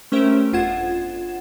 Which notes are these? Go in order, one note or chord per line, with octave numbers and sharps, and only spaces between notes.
A3 C#4 G4 A#4 C5 E5
G1 F2 F4 F#5 G#6 E7